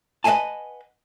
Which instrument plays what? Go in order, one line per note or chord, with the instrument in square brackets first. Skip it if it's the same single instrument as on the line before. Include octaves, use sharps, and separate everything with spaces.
[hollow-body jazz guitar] B4 D#5 F5 F#5 G#5 A5